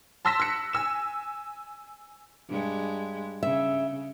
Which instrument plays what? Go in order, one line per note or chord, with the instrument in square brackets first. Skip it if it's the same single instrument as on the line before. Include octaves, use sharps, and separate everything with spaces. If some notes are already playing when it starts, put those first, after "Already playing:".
[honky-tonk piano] A5 C6 E6 A#6 B6 E7
E6 F#6 C#7
G#5 E6 E7
[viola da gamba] G2 G#3
[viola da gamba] C#3 [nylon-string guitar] E5